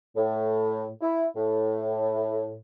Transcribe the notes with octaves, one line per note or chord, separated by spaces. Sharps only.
A2
E4
A2